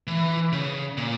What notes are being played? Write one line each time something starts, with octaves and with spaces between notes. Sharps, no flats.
E3
C#3
A#2